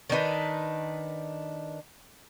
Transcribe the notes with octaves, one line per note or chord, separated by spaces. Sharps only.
D#3 D4 D#4 B4